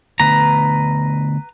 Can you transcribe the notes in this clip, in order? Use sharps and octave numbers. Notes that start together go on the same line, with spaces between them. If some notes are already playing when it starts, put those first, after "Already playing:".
D3 A3 B3 B4 A#5